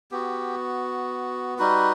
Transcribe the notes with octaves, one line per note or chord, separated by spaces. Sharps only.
B3 F#4 G4
G3 D#4 F#4 B4